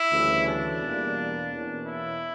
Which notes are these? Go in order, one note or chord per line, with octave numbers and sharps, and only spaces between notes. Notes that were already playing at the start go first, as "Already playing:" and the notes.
Already playing: E4
D2 C#3 E3 G3 C#4
D4
E2 B2 G3 A#3
E2 B2 A#3 C#4
E4